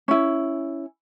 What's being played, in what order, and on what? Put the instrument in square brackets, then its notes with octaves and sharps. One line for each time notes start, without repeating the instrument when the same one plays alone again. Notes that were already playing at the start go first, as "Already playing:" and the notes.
[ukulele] C#4 E4